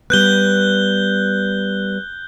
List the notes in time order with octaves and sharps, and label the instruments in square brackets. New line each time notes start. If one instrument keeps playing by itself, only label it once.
[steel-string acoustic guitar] G3 B3 [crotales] F#6 G6 G7